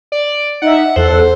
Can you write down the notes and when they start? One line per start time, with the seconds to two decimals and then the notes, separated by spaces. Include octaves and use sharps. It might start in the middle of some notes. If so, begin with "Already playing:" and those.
0.12 D5
0.62 D#4 E5 F#5
0.96 E2 A4 C5 F#5